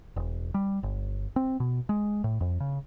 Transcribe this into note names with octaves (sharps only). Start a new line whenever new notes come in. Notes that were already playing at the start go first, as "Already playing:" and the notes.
E1
G3
G1
C4
B2
G#3
A2
F2
C#3